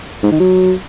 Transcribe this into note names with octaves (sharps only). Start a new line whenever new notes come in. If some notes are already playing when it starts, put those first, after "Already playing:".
G#2
D#3
F#3